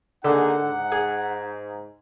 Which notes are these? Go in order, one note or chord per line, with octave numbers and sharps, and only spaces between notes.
D3 A#3 D#4 G#4 F#5
G#2
G#4